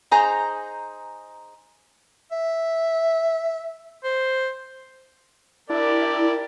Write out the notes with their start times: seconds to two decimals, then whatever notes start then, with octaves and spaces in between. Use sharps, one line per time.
0.11 D#4 G#4 C5 A#5
2.32 E5
4.04 C5
5.70 D4 E4 G4 A#4 D5